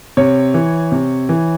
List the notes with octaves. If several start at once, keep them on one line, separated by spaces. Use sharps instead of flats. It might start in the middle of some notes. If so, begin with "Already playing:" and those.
C3 C#5
E3
C3
E3